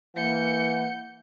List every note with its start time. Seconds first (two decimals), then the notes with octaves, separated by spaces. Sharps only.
0.17 E3 A#3 F#5 G6 C#7